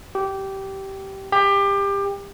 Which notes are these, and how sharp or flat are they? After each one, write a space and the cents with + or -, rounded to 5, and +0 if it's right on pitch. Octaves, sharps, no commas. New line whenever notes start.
G4 -15
G4 +25